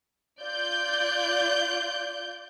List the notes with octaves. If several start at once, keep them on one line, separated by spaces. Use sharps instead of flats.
F4 D5 G6